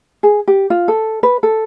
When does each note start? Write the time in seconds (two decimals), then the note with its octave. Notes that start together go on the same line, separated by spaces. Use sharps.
0.23 G#4
0.48 G4
0.70 F4
0.88 A4
1.23 B4
1.43 A4